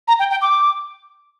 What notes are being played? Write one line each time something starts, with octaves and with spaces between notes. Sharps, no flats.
A#5
G5
G5
D6